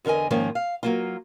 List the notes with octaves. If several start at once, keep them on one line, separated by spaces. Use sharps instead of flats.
E2 D3 A#4 D#5 G#5
G#2 D#3 F3 A#3 C#4
F5
F#3 A#3 F4